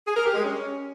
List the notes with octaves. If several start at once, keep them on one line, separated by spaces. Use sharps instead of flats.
G#4
A#4
G4
G#3
C#4